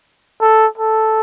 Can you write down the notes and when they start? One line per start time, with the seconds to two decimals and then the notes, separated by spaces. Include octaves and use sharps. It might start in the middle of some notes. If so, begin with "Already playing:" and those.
0.41 A4
0.78 A4